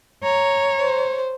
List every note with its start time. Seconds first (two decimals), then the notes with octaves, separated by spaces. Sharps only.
0.23 C#5 A#5
0.79 C5